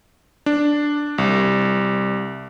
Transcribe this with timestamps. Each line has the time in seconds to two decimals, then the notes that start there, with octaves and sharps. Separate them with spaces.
0.46 D4
1.18 C2